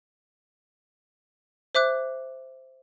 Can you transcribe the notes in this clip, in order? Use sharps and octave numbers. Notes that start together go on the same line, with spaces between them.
C5 E5 D6 F#6